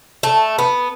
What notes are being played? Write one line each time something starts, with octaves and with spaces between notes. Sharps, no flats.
A3
B3